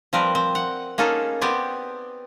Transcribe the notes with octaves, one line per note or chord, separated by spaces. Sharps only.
F3 G3 C4 A#4 B4
C4
F#5
A#3 C#4 D#4 G#4 A4
B3 C4 G4 D5 G#5